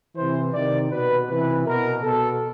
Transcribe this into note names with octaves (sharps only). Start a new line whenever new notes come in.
C3 E3 C5
C3 D#3 D5
B2 B4
C3 E3 B4
B2 A#4
B2 A4